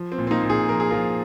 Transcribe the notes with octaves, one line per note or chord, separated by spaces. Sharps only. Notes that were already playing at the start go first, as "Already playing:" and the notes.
Already playing: F3
C4
A#2
C4
A#3 D#4
A#2
D#4 G#4
F3 A#4
G#4
F3 F4 A#4